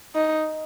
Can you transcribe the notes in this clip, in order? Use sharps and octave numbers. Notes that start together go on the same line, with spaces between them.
D#4